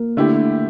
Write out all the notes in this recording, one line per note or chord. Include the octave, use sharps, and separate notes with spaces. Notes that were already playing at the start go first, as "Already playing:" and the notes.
Already playing: A#3
D3 A3 E4 G4